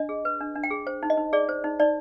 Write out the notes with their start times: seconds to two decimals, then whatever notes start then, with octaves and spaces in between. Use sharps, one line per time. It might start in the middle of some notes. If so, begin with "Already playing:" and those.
Already playing: D4 D#5
0.09 G#4
0.25 B4
0.40 D4
0.55 D4
0.63 G5
0.71 G#4
0.87 C5
1.03 D#4
1.10 D#5
1.17 D#4
1.33 G#4 D5
1.49 C5
1.64 D#4
1.80 D#4 D5